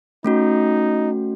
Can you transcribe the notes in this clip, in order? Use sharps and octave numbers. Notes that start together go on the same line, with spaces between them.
A3 C#4 D#4 F#4